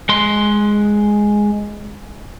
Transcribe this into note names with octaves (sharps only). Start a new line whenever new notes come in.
G#3 C6